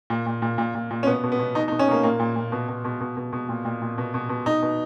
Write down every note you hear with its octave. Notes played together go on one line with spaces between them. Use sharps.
A#2
A#2
A#2
A#2
A#2
A#2
C#4
B2 B3
B2
B3
B2
B2 D#4
D#4
B2
C#4
B2 A#3
A#2 A#3
A#2
A#2
B2
B2
B2
B2
B2
B2
A#2
A#2
A#2
B2
B2
B2
B2 D#4
B2